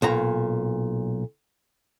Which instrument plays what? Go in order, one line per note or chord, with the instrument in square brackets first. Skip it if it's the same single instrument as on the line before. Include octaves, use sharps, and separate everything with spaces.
[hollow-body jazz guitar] B1 A#2 A#5